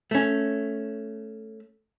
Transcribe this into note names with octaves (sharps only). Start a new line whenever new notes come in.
A3 C#4